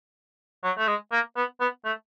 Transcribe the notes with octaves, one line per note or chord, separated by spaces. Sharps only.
F#3
A3
G#3
A#3
B3
B3
A3